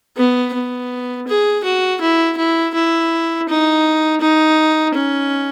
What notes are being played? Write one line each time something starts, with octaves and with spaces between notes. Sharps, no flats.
B3
B3
G#4
F#4
E4
E4
E4
D#4
D#4
C#4